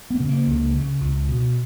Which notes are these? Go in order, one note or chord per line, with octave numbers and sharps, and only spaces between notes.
B3
C#3
A#3
C#2
C#3
C#2
B2